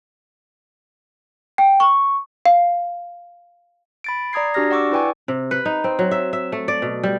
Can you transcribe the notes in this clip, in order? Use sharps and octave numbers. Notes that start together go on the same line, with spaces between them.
G5
C#6
F5
B5 A6 D7
D5 A#5 D#6 G#6 C7
D4 F#4 G4 D5 F6 A#6
D5 F#5 C#6 D6 E6
E4 B4 D5 G5 G#5 C#6
C3
B4
D#4
C4
F#3
E5
E5
A3
D5
B2
G3